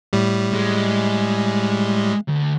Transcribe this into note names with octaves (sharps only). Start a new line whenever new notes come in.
A2 G3
G#3
D2 D3